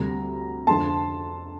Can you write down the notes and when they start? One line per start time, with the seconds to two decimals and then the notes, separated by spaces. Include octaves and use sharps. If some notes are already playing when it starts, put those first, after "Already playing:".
Already playing: D2 C3 G3 A#5
0.67 F2 D3 F3 A5 C6